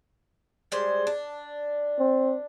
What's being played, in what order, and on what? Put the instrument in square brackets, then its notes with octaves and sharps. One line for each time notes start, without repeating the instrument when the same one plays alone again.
[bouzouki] G3 G#3 C5
D4
[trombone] C4